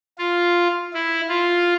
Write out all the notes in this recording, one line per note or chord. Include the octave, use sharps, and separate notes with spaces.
F4
E4
F4